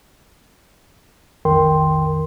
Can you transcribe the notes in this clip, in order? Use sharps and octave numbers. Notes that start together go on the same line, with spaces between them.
B1 F2 D#3 A#4 G5 C6